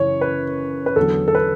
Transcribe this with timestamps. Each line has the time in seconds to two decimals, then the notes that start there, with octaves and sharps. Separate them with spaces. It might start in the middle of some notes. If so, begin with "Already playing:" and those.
Already playing: F#2 C#3 E3 C#5
0.21 B4
0.86 B4
0.96 E2 D3 F#3 A4
1.28 A4
1.35 B4